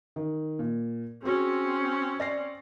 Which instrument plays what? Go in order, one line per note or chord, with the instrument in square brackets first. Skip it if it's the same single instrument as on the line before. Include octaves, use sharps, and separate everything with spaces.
[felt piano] D#3
A#2
[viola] C4 C#4 [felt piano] F#4 G#4
[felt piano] D5 A#6 C7